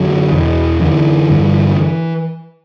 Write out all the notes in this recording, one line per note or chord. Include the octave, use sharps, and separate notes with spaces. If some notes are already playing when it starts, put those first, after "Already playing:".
Already playing: F#2 D3 F#3
E2 B2 E3
F#2 D3 E3
G2 D3